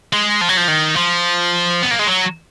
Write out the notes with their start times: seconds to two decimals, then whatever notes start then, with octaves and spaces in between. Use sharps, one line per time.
0.13 G#3
0.41 F3
0.49 F#3
0.57 F3
0.68 D#3
0.96 F3
1.83 B3
1.91 A#3
1.99 G#3
2.07 F#3